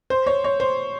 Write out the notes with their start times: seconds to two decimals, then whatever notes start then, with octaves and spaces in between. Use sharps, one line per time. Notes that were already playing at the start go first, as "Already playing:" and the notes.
0.10 C5
0.26 C#5
0.44 C#5
0.60 C5